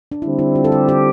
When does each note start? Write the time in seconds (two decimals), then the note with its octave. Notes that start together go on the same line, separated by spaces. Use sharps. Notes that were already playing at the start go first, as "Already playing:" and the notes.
0.12 D4
0.22 D3 G3 C4 E4
0.39 E4
0.55 F4
0.64 A4
0.72 G4
0.89 G4